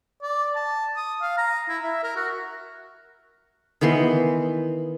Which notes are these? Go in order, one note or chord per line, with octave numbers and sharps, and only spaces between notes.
D5
A5
D#6
F5
A#5
E4
E5
A#4
F#4
D#3 E3 B3 C6